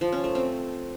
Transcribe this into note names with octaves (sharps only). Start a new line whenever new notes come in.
F3
C#4
A3
C4